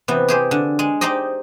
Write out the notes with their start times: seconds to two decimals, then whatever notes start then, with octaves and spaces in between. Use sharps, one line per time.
0.08 C3 E3 B3
0.29 G4 G#4 C5
0.51 D3
0.79 G#3
1.01 D#4 G4 C5 D5 D#5